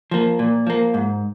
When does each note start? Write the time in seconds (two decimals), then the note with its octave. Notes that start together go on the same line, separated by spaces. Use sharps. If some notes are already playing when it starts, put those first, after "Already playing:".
0.11 F3 A#3
0.39 A#2
0.67 F3 A#3
0.94 G#2